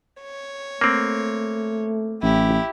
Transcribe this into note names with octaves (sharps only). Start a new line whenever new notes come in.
C#5
A3 A#3 C4
A1 E4 G4